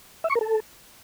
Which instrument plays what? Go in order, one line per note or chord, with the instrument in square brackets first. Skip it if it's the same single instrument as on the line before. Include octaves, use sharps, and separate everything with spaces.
[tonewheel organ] E5
C#6
A#4
A4